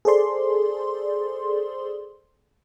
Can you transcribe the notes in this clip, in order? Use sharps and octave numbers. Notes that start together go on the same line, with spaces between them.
G#4 A4 C5 D5 C6